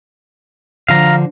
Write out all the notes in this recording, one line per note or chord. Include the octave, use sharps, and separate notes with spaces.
D3 F3 F5 A#5